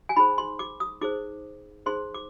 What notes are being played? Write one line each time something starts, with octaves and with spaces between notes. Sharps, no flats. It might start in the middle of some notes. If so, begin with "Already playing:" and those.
G#5
D#4 G#4 C5 B5
C6
D6
D#6
D#4 G#4 C5 D6
D#4 G#4 C5 C6
D6